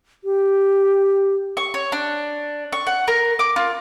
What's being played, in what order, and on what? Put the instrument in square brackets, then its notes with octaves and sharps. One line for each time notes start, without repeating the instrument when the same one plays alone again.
[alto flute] G4
[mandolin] C#6
C#5
D4
C#6
F#5
A#4
D6
F4